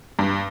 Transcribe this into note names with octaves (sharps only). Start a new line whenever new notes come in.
G2